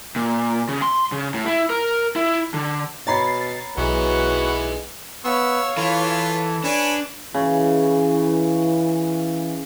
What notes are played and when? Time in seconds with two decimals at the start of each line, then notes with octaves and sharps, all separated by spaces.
0.16 A#2
0.69 C#3
0.82 C6
1.12 C#3
1.34 A2
1.46 E4
1.70 A#4
2.16 E4
2.54 D3
3.07 B2 C#5 A#5 B5 A6 C7
3.77 B1 E3 G#3 B3 F#4
5.25 B3 C#5 F5 C#6 E6
5.77 E3 F4 A4 B4
6.64 D4 B4 C#5 G#5
7.34 C#3 E3